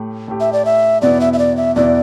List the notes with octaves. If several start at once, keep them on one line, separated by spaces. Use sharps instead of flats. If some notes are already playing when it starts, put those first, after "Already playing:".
Already playing: A2 A3 G4
A2 A3 G4
E5
D5
E5
E2 B2 B3 E4 D5
E5
E5
D5
E5
E2 B2 B3 E4 D5